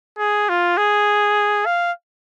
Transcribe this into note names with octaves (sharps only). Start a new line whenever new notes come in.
G#4
F4
G#4
F5